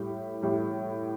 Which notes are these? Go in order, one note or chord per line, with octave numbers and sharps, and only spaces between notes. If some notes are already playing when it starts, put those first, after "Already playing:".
Already playing: A2 G3
A2 G3